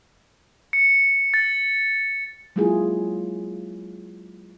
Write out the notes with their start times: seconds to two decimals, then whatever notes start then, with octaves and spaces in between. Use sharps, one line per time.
0.73 C#7
1.34 A6
2.56 F#3 G#3 A#3 E4 F4 G#4